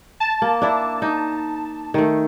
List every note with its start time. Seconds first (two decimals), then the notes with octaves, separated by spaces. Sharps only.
0.20 A5
0.42 A#3
0.62 D4 E4
1.02 D#4
1.94 D#3 A3